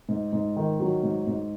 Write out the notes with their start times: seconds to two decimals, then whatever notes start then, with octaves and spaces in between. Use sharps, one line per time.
0.09 G#2
0.33 G#2
0.56 D#3
0.80 F#3
1.03 G#2
1.27 G#2